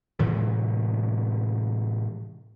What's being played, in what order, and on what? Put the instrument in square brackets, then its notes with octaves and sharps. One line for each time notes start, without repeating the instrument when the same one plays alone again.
[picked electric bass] A2 C3 E3 G#3